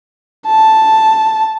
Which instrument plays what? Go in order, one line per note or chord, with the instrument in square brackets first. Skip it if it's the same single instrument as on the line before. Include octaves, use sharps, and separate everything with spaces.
[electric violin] A5